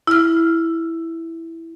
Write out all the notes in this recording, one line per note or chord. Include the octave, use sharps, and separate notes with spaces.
E4 F6